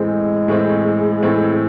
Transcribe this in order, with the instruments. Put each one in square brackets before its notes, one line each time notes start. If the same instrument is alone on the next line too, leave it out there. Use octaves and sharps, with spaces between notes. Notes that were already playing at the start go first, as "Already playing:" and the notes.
Already playing: [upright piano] A2 E3 C4 [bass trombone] G#3
[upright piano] A2 E3 C4
A2 E3 C4